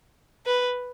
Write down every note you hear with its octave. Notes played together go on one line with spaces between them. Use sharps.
B4